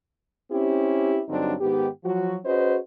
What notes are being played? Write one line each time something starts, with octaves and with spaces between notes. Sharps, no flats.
C4 C#4 E4 G4
G2 D3 F#3 C4 D4 D#4
G#2 D#3 B3 G4
F3 F#3 F#4
C#4 F#4 G#4 B4 C5 D#5